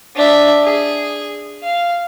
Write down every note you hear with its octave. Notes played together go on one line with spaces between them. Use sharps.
D4 E5
G#4
F5